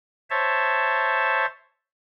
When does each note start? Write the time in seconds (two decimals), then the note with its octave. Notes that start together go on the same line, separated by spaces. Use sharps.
0.30 C5 C#5 E5 A5